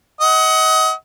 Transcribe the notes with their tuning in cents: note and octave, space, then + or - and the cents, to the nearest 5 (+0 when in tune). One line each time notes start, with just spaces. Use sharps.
D#5 +30 F#5 +15